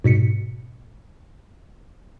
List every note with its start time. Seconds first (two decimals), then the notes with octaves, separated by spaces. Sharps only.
0.04 G#2 B2 B6 C#7